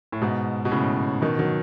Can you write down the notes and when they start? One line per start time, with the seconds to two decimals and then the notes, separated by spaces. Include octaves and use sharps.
0.12 A2
0.21 G#2 B2
0.65 B2
0.71 A2 C#3
1.22 B2 D#3
1.38 D#3 F#3